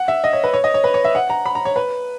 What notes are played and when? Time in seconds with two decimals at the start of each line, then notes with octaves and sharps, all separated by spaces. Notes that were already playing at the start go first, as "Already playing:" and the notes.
Already playing: F#5
0.08 E5
0.24 D#5
0.33 C#5
0.44 B4
0.54 C#5
0.64 D#5
0.74 C#5
0.84 B4
0.94 C#5
1.05 E5
1.15 F#5
1.30 A#5
1.46 B5
1.55 A#5
1.65 C#5
1.76 B4